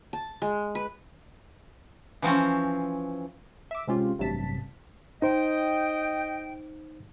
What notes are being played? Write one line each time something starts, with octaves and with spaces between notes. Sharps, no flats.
A5
G#3
B4
E3 F3 C4 C#4
E5 D6
C3 G#3 C4 C#4 F4 G4
A1 G2 C3 F#3 A5 B6
D#4 C5 D#5 G5